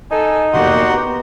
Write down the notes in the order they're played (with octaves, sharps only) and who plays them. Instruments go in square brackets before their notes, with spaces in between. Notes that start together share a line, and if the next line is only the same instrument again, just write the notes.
[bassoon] D#4 [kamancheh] A4 [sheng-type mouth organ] G#5
[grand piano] F1 E2 A#3 [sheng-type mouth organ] F#4 F#5 C6 [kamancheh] G4
[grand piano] B3 A#5